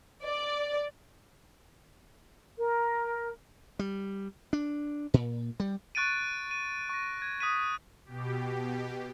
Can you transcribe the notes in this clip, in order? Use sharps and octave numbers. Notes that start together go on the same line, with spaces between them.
D5
A#4
G3
D4
A#2
G3
C#6 F#6 A6 D7 D#7
D#7
C#6 A#6
G#6
D#6 F#6 B6 D#7
B2 G4